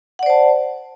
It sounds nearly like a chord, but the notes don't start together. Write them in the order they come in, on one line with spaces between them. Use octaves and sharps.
F#5 D5 C5 A5